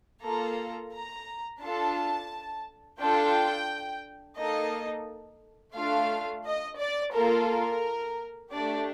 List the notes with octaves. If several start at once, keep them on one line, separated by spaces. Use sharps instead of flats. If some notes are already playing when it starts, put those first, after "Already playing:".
A#3 F4 A4 A#5
A#5
D4 F4 A4 A5
D4 F4 A4 G5
A#3 D#4 A4 D#5
A3 D4 F4 F5
D#5
D5
A#3 F4 A4 A#4
A#4
A3 D4 G4 D5